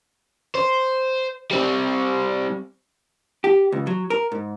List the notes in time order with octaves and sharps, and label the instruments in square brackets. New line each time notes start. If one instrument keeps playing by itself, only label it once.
[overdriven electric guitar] C5
G3 C4
[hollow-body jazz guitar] G4
C#2
F#3
A#4
G#2